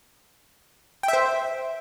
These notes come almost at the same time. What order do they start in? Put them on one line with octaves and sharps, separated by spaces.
G5 E5 C5